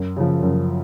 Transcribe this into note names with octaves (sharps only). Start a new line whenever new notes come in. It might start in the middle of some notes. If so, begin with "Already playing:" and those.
Already playing: F#2
C#3 F3
F#2